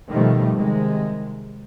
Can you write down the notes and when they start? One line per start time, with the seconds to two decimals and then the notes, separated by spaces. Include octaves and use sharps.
0.10 B2 D#3 F3 G3 A3
0.53 C3 D#3 G#3